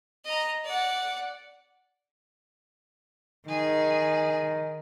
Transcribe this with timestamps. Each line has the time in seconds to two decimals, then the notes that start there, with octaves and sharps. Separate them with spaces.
0.25 D#5 A#5
0.65 D5 F#5
3.49 D#3 G#4